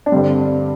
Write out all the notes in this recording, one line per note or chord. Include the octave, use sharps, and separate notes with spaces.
D4
G2 D3 G3 C4